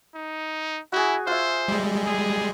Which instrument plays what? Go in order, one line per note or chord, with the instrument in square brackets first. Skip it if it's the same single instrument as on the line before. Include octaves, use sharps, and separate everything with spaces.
[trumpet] D#4
[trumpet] E4 [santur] F#4 G#4
[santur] F4 E5 [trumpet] C5
[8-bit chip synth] G3 G#3
[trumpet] G#4